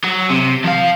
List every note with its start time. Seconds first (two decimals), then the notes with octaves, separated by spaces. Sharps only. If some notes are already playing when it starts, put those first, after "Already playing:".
0.04 F#3
0.30 C3
0.64 F3 F5